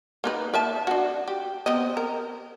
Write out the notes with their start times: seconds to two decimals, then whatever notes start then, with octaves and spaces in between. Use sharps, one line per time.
0.24 A#3 D#4 B4
0.54 A#4 E5 A5
0.87 D4 F#4
1.28 G4
1.66 B3 C4 D#5
1.97 A#4